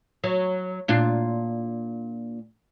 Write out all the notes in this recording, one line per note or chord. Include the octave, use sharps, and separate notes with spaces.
F#3
A#2 D4 F4